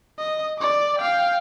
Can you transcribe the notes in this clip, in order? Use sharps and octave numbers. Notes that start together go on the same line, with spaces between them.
D#5
D5 D6
F5 G5